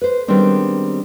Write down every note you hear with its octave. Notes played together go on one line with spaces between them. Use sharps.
B4 C5
D#3 G3 G#3 B3 C4 D4